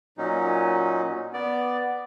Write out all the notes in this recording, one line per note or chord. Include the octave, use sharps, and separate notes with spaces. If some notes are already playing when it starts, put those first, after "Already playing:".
A#2 F#3 C#4 D#4
B3 D5